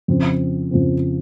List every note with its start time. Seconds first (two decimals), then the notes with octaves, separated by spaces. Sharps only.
0.08 F2 C#3 F3 C4
0.71 F2 C#3 F3 C4